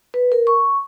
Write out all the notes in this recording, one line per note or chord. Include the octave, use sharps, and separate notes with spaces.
B4
A#4
C#6